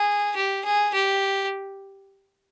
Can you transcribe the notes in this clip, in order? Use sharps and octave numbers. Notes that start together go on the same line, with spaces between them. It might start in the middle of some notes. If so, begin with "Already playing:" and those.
Already playing: G#4
G4
G#4
G4